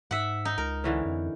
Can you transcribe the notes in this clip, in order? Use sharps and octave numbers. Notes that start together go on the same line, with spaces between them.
G#2 E5 F#5
D#4
C#2 A#4
D3 E3 C#4
F2